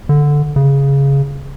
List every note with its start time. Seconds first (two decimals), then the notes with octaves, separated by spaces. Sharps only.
0.09 D3
0.56 C#3